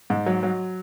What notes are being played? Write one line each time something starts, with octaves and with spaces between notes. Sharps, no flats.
G#2
F#3
F#3